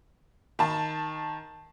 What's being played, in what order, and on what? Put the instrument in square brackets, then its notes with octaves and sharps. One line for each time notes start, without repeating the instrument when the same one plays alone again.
[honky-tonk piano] D#3 A5